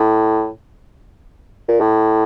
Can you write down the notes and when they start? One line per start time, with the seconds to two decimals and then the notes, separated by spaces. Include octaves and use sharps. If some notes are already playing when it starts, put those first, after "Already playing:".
Already playing: A2
1.68 A#2
1.80 A2